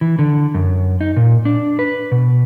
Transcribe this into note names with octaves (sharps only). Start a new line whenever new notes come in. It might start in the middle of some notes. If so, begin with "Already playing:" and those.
E3
D3
F#2
D#4
A#2
D4
B4
B2